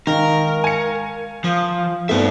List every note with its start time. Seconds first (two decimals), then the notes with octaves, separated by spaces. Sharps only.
0.07 D#3 G#3 A#4 F5 C#6
0.64 G#5 C#7
1.44 F3 F4 F5 D#6
2.09 G2 A3 B3 C4 D#4 F4 D5 E5